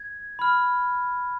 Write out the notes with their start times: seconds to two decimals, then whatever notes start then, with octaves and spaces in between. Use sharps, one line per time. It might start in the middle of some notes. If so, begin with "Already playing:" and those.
Already playing: G#6
0.39 B5 F6